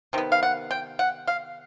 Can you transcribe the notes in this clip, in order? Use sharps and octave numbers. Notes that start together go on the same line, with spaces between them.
C3 D#3 B3
F5
F#5
G5
F#5
F5